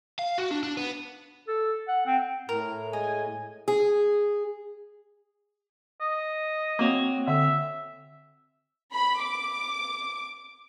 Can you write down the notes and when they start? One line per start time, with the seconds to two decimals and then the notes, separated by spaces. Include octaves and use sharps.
0.19 F5
0.38 F#4
0.51 D4
0.63 D4
0.77 B3
1.48 A4
1.88 F#5
2.06 C4
2.49 A2 A#4
2.93 G#3 G#4 D#5 G#5
3.68 G#4
6.01 D#5
6.79 A#3 C4 F#4 C#5
7.28 D3 E5
8.93 B5
9.25 D6